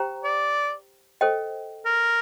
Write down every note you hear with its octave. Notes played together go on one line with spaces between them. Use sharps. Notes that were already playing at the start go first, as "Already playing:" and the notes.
Already playing: G4 C5 G5 A#5
D5
A4 C5 D#5 G5
A#4